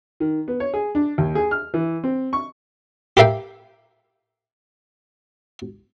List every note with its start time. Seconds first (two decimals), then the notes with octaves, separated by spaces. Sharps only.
0.20 D#3
0.48 B3
0.60 C#5
0.74 G#4
0.95 D4
1.18 D#2
1.35 G#4
1.51 F6
1.74 E3
2.04 C4
2.33 C#6
3.17 G4 A#4 E5 F5 G5